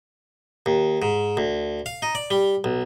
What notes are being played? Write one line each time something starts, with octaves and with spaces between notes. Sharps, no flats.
D#2
G#2
D2
F5
D#4
D5
G3
B1